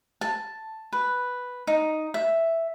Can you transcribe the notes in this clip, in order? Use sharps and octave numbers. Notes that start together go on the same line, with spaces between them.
A5
B4
D#4
E5